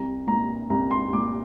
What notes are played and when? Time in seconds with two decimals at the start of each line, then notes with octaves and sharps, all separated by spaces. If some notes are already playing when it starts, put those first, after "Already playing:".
Already playing: C2 A#5
0.27 A#2 A#5
0.70 C2 A#5
0.91 C6
1.13 A#2 D6